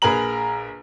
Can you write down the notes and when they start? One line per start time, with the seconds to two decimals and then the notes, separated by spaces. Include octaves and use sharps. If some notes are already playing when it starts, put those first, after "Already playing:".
0.02 A#1 G#4 A#4 B4 A#5 F#7